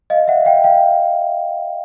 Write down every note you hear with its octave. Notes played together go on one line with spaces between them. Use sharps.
D#5 F5
E5 F#5
F5 G5
F5 G5